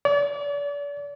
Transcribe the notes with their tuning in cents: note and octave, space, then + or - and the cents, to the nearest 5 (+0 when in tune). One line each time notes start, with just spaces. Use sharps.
D5 -40